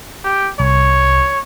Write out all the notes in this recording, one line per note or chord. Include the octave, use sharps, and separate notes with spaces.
G4
C2 C#5